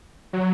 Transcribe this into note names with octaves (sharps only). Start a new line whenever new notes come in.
F#3